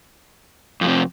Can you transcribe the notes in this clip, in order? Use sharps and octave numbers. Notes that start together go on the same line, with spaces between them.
F2 A2 C3